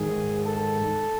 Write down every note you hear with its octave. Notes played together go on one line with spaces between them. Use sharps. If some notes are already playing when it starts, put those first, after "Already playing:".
Already playing: G#2 D#3 G#4
A4